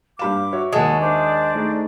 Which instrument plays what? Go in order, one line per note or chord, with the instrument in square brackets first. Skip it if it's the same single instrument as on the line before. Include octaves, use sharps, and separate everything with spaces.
[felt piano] G2 B5 E7 [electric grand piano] G4 F5 [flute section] D6
[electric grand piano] F#4 C#5 E5
[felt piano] D#2 D#6 [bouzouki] G#3 [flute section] F#5 A5
[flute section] D4 C5 D5
[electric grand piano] A3 D#4 G#4